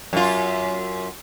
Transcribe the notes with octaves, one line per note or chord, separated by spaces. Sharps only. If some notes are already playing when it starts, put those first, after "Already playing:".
F#2 F4